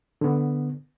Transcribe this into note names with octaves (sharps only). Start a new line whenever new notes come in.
D3 B3